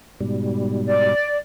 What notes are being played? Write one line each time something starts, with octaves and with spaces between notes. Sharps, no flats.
G#2 B2 G3
D5